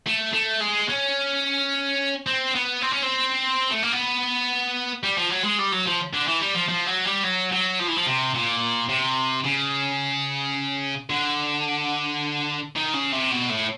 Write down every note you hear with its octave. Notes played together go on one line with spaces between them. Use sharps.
A3
A3
G#3
C#4
C4
B3
C4
C#4
C4
A3
A#3
B3
G3
F3
F#3
G#3
G3
F#3
F3
D3
E3
G3
F3
F3
F#3
G3
F#3
F#3
F3
E3
F3
C3
A#2
C3
C#3
D3
D#3
C#3
C3
B2
A2